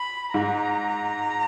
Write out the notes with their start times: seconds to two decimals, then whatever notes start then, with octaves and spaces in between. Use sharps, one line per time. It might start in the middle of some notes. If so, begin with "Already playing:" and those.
Already playing: B5
0.34 G#2 A#5